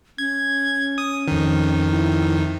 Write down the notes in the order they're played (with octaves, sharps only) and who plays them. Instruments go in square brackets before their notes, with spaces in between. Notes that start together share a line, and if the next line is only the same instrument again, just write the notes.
[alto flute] C#4 [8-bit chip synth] G#6
[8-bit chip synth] D#6
F2 D#3
[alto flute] E4